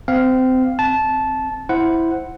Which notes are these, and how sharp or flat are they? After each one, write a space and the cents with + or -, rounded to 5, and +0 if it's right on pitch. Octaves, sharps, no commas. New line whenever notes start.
C4 -25 F5 +0
C4 +0 A5 -15
E4 +0 C5 +0 F#5 +0